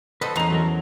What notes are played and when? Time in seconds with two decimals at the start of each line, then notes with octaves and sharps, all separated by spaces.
0.21 A4 B4 C5 D#5 F#5
0.36 E2 C#4 C5 D#5 A#5
0.50 F#3 A4 A#4
0.67 F#3